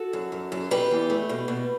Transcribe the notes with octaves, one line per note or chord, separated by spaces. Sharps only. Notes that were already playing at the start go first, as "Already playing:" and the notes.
Already playing: F#4 A4
F#2
F#2
F#2
B2 G4 B4
E2
A3
B2
B2